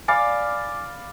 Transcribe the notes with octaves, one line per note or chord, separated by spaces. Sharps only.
D5 F5 G#5 B5